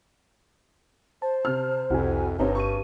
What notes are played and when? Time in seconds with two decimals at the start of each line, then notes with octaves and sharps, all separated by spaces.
1.22 C5 A5
1.45 C3 F6
1.90 C2 F2 C3 E4 F#4 G#5
2.39 G1 G2 C4 D#4 G4 C#5
2.55 G4 C#6 D#7